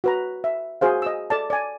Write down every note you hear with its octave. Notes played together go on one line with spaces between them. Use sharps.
F#4 B4 A#5
E5
F#4 G#4 C5 F5
D#5 E6
A4 D5 A5
D5 G#5